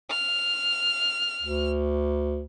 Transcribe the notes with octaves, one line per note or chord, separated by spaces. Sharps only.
F6
D2